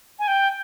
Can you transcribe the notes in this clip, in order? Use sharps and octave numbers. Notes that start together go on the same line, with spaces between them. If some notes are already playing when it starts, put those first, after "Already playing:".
G#5
G5